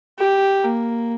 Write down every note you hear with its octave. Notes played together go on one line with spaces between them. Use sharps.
G4
A#3